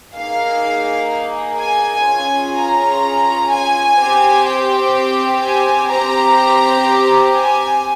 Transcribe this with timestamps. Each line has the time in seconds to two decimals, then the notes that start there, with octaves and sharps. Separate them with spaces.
0.15 A#3 D#4 G#4 F5
1.59 G#5
2.07 C#4 F4 G#4
2.55 A#5
3.51 G#5
3.99 C4 G4
4.47 G5
5.43 G#5
5.91 C4 G4 A#5
7.35 G#5